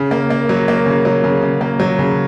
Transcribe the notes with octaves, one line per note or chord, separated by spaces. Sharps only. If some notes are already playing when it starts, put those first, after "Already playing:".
Already playing: C#3
A#3
A#3
F#3
A#3
C#3
F#3
C#3
C#3
A#3
F#3
C#3